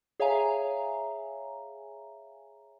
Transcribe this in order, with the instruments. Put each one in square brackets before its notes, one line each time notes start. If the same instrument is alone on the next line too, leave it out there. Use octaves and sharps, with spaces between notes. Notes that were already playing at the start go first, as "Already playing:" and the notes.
[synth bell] G#4 C#5 E5 F5 G#5 A#5